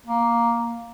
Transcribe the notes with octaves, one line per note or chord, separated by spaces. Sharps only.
A#3